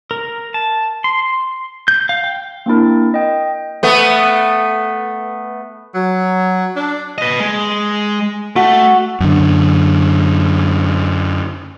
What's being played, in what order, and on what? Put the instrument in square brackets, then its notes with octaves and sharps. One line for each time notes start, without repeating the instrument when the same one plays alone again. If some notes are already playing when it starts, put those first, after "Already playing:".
[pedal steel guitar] A#4
A5
C6
G6
F5
G5
[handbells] A#3 C4 D4 E4 A#4
D#5 G5
[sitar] A3 B3
[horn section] F#3
D4
[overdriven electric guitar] B4 D#5
G#3
[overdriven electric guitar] A3 [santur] F#4
[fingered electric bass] F#2 D3